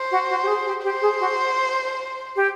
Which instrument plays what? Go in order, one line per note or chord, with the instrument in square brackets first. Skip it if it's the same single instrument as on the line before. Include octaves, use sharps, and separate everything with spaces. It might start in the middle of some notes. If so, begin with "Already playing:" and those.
Already playing: [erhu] C5
[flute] F#4
F#4
G4
G#4
G4
[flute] G4 [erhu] C5
[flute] G#4
F#4
G4